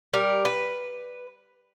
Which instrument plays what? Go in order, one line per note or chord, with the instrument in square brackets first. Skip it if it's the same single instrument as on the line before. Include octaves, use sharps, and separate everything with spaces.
[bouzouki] G3 A#4
B4